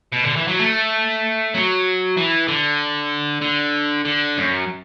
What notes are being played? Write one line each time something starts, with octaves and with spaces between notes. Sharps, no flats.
B2
D3
E3
F#3
A3
F#3
E3
D3
D3
D3
F#2